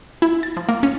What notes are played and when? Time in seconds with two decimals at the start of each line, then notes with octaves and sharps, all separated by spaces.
0.22 E4
0.43 A6
0.57 F3
0.69 A#3
0.83 C#4